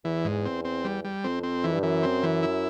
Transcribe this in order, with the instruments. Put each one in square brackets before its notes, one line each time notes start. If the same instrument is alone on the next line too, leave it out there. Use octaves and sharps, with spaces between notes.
[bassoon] E2 [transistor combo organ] E3
[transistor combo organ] G#2
C4
C4
G3
G3
[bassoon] F2 [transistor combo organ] C4
[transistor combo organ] C4
E3
[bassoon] G2
[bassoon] F#2 [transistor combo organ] E3
[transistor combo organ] C4
E3
E4